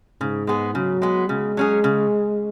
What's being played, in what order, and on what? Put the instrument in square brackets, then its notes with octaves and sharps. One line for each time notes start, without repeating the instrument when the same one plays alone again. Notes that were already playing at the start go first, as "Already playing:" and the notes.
[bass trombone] G#2 [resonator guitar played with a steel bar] C#3
[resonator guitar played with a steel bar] G#3 B3 G#4
[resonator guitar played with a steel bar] C#3 [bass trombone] F#3
[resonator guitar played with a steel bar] G#3 B3 G#4
[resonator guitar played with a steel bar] C#3 [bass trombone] G#3
[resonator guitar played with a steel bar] F#3 C#4 G#4
C#3